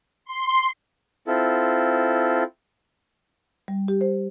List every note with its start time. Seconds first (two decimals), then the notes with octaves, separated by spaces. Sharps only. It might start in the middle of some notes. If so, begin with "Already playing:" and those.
0.25 C6
1.27 C4 E4 F4 A4
3.68 G3
3.88 G4
4.01 C5